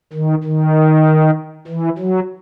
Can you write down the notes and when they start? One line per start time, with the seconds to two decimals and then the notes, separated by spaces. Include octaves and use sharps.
0.13 D#3
0.44 D#3
1.68 E3
1.98 F#3